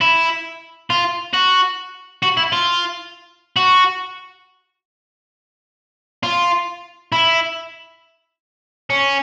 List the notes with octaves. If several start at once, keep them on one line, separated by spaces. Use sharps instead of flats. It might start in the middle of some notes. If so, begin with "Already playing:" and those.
E4
F4
F#4
F#4
E4
F4
F#4
F4
E4
C#4